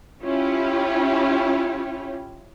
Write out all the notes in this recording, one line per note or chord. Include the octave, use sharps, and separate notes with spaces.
C#4 E4 F4 G4 C#5